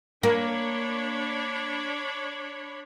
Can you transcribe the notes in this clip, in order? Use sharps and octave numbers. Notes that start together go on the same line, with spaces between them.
A#3 D4 C#5 B5